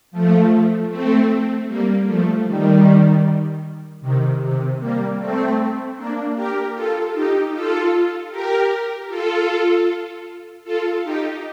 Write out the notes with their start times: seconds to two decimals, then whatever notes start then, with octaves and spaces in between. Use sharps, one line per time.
0.11 F3 A3
0.89 A3 C4
1.67 G3 A#3
2.06 F3 A3
2.45 D#3 G3
4.01 C3 D#3
4.41 C3
4.79 G3 A#3
5.18 A3 C4
5.96 A#3 D4
6.35 G4 A#4
6.74 F4 A4
7.13 D#4 G4
7.52 F4 A4
8.30 G4 A#4
9.08 F4 A4
10.64 F4 A4
11.03 D#4 G4